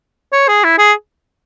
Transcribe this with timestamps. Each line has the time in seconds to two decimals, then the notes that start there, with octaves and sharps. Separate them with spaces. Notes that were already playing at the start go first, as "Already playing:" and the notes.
0.32 C#5
0.48 G#4
0.64 E4
0.78 G#4